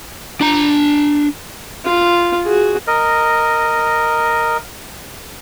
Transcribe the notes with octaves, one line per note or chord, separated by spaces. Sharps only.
D4 A#5
F4
F#4 G#4
A#4 D#5